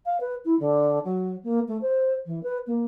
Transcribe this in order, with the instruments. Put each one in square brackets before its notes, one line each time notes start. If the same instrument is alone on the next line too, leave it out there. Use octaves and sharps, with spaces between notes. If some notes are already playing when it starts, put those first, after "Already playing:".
[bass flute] F5
B4
E4
D3
F#3
A#3
A3
C5
E3
B4
A#3